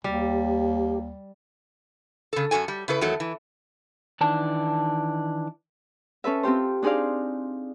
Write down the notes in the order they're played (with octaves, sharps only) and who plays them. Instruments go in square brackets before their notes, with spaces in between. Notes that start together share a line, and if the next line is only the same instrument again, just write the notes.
[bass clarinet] D#2 [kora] G3 [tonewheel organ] G4
[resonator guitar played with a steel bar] C#3 A4
F#2 C#3 F#4 A4 G#5
G3
C#3 E4 A4 B4
E2 D#3 F#3 A3 A4
E3
[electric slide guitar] D#3 E3 D4 A5
[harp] C#4 A4 B4 E5
C4 F4 G4 C5
D4 D#4 G#4 C5 D5 F5